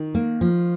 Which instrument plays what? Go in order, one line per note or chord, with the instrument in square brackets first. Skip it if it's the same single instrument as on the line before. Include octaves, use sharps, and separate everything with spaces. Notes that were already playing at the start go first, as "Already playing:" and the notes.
Already playing: [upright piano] D#3
[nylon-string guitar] A#3
F3